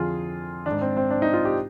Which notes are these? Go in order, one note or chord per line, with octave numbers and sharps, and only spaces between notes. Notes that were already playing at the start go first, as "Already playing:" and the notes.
Already playing: F2 D3 F4 G#4
G#2 D#3 D4
C4
C4
D4
D#4
F4
G4